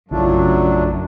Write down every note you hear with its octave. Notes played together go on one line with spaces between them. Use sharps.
A#1 F#2 C#3 F#3 A3 D4 E4 F4